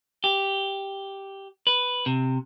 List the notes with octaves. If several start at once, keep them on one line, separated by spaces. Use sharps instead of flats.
G4
B4
C3